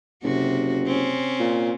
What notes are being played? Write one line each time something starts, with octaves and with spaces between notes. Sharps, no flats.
F#1 C3 F#4
C4 C#4
A#2